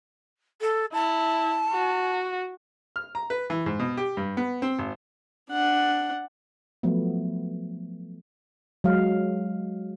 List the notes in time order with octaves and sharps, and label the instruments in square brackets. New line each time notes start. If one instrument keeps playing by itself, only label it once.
[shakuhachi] A4
[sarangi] E4 [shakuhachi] A5
[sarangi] F#4
[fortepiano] F6
A#5
B4
E3
G#2
B2
G4
G2
B3
C4
G#1
[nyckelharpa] D4 F#5
[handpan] F3 F#3 A3 B3
F#3 G#3 F5